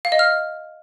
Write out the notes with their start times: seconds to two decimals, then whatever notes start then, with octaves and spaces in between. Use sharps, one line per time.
0.05 F5
0.12 D#5
0.19 F6